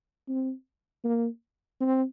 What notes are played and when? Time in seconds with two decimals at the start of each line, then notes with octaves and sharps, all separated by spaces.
0.29 C4
1.05 A#3
1.81 C4